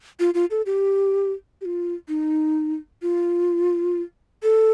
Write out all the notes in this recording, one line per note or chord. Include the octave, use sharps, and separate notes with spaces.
F4
F4
A4
G4
G4
F4
D#4
F4
A4